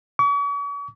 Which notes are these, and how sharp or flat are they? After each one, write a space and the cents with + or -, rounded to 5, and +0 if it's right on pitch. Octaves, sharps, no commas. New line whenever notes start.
C#6 +45